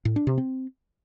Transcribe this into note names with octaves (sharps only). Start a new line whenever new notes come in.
A2
D4
C3
C4